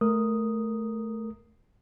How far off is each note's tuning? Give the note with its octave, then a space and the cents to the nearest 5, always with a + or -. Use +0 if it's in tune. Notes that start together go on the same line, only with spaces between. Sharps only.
A3 -10 A#4 -5 D#6 +0